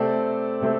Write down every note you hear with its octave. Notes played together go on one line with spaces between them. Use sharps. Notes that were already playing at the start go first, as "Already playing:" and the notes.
Already playing: C3 A3 C4 A4 D5
C3 A3 C4